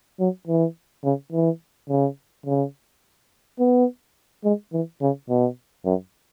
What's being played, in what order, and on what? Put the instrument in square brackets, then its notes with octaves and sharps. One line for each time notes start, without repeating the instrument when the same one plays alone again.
[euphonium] F#3
E3
C#3
E3
C#3
C#3
B3
G#3
E3
C#3
B2
F#2